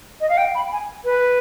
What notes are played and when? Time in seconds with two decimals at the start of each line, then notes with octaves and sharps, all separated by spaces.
0.20 D#5
0.29 F5
0.37 G5
0.55 B5
0.72 G#5
1.05 B4